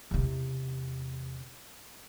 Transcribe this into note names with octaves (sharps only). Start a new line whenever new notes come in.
E2 C3